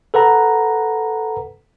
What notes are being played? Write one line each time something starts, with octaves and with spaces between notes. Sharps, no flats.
A4 B4 F#5 A#5